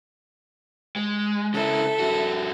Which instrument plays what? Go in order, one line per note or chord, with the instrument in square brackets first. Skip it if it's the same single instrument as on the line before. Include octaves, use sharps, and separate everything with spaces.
[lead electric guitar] G#3
[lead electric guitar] C#3 E4 [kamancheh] A4 E5
[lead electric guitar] G2 F#4